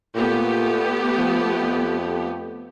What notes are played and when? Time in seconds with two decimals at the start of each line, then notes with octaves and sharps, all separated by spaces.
0.15 A#2 A3 B3 G4
1.18 F3
1.60 F2